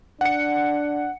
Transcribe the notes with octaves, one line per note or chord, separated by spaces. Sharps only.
D4 F#5 C#7